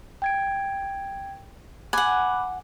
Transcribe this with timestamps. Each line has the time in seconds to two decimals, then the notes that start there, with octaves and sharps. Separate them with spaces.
0.22 G5 G#6 D7
1.93 F#5 G#5 B5 D6 F#6